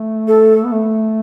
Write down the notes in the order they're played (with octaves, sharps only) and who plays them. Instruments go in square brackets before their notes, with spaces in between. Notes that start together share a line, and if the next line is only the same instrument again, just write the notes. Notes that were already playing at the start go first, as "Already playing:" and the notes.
Already playing: [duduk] A3
[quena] A4
[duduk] B3
A3